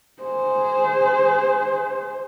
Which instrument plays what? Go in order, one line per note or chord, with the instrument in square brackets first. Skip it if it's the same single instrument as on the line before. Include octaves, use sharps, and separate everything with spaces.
[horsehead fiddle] G#4 C5